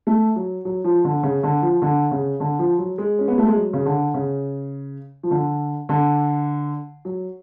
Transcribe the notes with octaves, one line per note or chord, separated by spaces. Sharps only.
A3
F#3
F#3
F3
D3
C#3
D3
F3
D3
C#3
D3
F3
F#3
G#3
C#4
B3
A3
G#3
F#3
C#3
D3
C#3
F3
D3
D3
F#3